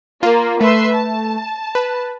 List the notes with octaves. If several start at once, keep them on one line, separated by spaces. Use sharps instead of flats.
A#3 F4
A3 B4 E5 C6
A5
B4